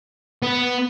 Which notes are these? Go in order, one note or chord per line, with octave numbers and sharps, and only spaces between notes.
B3